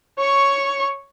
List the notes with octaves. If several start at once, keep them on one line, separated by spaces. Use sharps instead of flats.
C#5 C#6